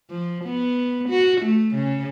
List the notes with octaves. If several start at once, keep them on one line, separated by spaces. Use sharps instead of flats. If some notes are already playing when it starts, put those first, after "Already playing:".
F3
B3
F#4
A3
C#3